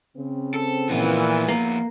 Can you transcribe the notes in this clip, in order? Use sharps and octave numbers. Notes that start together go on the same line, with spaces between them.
C#3 C4
A4
A#2 E3 F3 B3
A#3